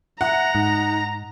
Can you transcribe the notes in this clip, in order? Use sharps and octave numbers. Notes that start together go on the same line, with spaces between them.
E5 F#5 A#5
G#2 D#4